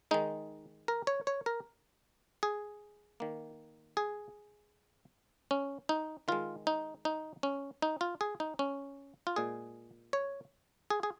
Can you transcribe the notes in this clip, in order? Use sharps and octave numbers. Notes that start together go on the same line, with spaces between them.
D#3 G#3 D#4
A#4
C#5
C#5
A#4
G#4
D#3 A#3
G#4
C#4
D#4
D#3 G#3 F4
D#4
D#4
C#4
D#4
F4
G#4
D#4
C#4
F4
A#2 G#3 G#4
C#5
G#4
G#4